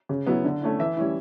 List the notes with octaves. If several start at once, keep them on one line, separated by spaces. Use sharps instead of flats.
C#3
F#3 B3 E4
D3
A3 C#4 E4
E3 E5
G3 C#4 E4